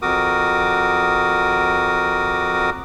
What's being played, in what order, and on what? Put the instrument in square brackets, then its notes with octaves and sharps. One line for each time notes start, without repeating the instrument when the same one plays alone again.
[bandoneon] F2 F#4 A#4 D6 D#6